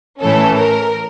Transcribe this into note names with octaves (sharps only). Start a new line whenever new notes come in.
A2 E3 A3 C#4 A4
A#4